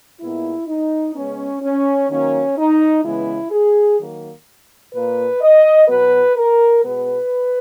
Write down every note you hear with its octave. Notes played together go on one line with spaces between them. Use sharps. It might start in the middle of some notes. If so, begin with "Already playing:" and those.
A#2 G#3 B3 E4
D#4
C#3 G#3 B3 C#4
C#4
D#3 F#3 A#3 C#4
D#4
C#3 E3 G#3 B3 E4
G#4
D#3 F#3 A#3
A#2 A#3 B4
D#5
B2 F#3 B3 B4
A#4
B2 G#3 B3 B4